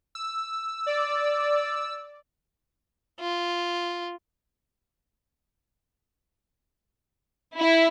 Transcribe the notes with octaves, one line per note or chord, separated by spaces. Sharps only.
E6
D5
F4
E4